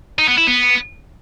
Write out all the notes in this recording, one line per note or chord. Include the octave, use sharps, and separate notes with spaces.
D#4
B3
E4
B3